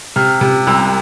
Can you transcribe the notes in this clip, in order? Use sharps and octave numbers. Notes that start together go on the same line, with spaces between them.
C3 F6
C3
C2 E6